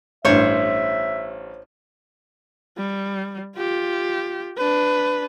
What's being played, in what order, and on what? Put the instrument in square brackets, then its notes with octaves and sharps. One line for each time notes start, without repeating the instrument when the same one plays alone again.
[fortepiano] A1 G2 [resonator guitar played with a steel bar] C5 C#5 [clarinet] E5
[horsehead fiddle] G3
F4 G4
D4 B4